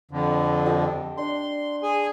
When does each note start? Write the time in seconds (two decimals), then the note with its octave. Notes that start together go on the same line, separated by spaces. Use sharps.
0.11 F2 D3
0.66 G4 D#5 A5
1.17 D4 C6
1.83 G#4 G#5